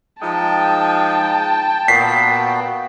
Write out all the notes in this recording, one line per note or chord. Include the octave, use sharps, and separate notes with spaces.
F3 G#3 D#4 G5 A5
A#2 B3 F#4 B6 C7